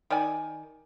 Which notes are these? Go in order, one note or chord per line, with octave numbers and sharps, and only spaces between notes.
D#3 D5 G#5